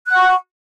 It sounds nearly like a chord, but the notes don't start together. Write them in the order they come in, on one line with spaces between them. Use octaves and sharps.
F#6 F#5 C#6